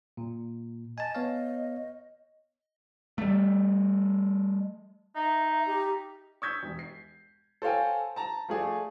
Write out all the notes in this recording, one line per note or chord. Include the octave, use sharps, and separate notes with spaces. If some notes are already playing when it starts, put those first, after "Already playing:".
A#2
D#5 G#5 A5
B3 C#5 F5
G3 A3
D#4 E5
G4
C#6 D#6 E6 G6 G#6 B6
E1
C7
A4 C5 C#5 F5 G5 G#5
A5 A#5
F3 A3 G#4 D5